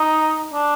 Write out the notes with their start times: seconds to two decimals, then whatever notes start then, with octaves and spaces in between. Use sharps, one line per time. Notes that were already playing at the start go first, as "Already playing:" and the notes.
Already playing: D#4
0.54 D4